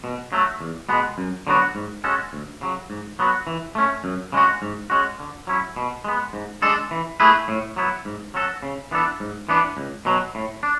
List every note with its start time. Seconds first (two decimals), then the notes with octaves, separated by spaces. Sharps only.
0.04 B2
0.33 F#3 A3
0.61 E2
0.89 B2 G#3 B3
1.18 F#2
1.47 D3 F#3 B3 F#4
1.75 G#2
2.04 G#3 C#4 F#4 A4
2.33 D2
2.61 C#3 F#3
2.90 G#2
3.19 F#3 B3 F#4
3.47 E3
3.75 A3 C#4
4.04 F#2
4.32 C#3 G#3 C#4 F#4
4.62 G#2
4.90 G#3 C#4 F#4
5.20 D3
5.47 F#3 C#4 E4
5.76 B2
6.04 G#3 B3
6.33 G#2
6.62 G#3 D4 A4
6.91 E3
7.20 A3 E4 G#4 B4
7.48 A2
7.76 F#3 B3 E4
8.05 G#2
8.34 F#3 C#4 F#4 A4
8.63 C#3
8.91 E3 B3 D4 A4
9.20 G#2
9.49 E3 B3 D4
9.77 C#2
10.05 B2 F#3
10.35 A2
10.63 D4